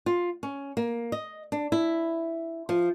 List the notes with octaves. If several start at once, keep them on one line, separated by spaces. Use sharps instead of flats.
F4
C#4
A#3
D#5
D4
E4
F3